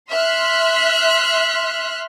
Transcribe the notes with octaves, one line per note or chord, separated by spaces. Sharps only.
E5 C6 F6 F#6 B6